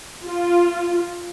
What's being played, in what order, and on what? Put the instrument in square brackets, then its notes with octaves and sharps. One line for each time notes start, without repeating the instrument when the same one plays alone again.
[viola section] F4